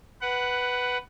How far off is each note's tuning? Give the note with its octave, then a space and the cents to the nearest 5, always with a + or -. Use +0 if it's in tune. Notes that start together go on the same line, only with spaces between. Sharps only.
B4 +0 F#5 +15